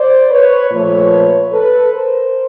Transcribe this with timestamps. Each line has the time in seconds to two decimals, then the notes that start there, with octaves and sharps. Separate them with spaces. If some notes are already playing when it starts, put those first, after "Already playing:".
Already playing: C5 D5
0.30 B4 C#5
0.71 A#2 F3 A3 B4 C#5
1.52 A4 B4
1.93 A#4 C5